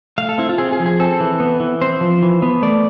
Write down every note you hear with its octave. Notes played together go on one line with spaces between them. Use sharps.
A3 F5
A4
C4 E4
F4
C4 G#4
G#4
F3
G#4
C4 A4
E3
B3
E3
C4 C5
F3
E3
B3
A3 D5